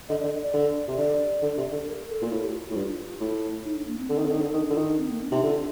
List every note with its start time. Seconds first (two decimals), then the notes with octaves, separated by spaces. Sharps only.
0.09 D3 D#5
0.20 D5
0.23 D3
0.30 D#5
0.42 D5
0.53 D3
0.88 C3
0.98 D3 D5
1.42 D3
1.57 C3
1.72 D3
1.87 A#4
2.09 A4
2.22 A#2
2.31 A2 F4
2.42 G4
2.51 F4
2.71 A2
2.76 G2 F4
3.21 A2
3.65 D#4
3.76 D4
3.87 A#3
3.98 C4
4.09 D3
4.18 D#3
4.25 D3
4.33 D#3
4.41 D3
4.48 D#4
4.54 D#3 D4
4.70 D3 F4
4.76 D#3 D#4
4.89 D4
4.98 C4
5.09 A#3
5.21 C4
5.27 D4
5.32 C3 D#4
5.43 D3 F4